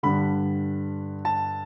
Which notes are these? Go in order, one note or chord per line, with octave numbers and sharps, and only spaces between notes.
G2 D3 B5
A5